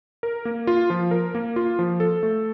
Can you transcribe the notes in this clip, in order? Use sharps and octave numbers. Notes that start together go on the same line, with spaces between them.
A#4
A#3
F4
F3
A#4
A#3
F4
F3
A4
A3